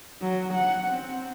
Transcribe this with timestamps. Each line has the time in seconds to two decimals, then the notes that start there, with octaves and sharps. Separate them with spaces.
0.21 F#3
0.54 F#5
0.88 C4